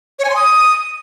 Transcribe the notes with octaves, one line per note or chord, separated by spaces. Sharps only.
C#5
G#5
C6
D#6